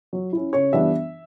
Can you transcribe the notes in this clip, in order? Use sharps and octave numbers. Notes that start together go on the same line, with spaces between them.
F#3
C#4 E4
C#3 C#5
E3 G3 B3 D4 E5